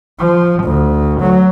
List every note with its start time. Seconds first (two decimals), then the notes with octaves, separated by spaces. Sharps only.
0.20 F3
0.64 D2
1.21 F#3